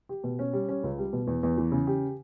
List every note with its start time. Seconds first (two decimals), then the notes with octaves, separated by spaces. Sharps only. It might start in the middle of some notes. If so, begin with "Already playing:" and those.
0.09 G4
0.24 B2
0.39 C#4
0.53 G3
0.69 C#4
0.83 C#2
0.99 G3
1.13 B2
1.27 E2
1.43 E2
1.58 E3
1.72 C#3
1.87 G4